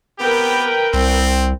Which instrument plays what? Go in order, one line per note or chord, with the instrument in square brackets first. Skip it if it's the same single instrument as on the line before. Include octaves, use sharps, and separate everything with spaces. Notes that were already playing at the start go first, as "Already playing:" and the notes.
[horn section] B3 C4 G4 [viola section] A#4 B4 G5
[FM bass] C2 [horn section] C4